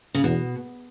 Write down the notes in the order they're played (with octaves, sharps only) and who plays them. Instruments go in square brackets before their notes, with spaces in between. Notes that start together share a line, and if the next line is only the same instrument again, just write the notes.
[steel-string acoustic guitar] C#3
[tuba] E2 [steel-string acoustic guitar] B2